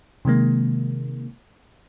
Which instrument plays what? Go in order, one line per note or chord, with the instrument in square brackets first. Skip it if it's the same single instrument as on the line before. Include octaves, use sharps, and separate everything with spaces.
[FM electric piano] C3 D#3 G#3 A#3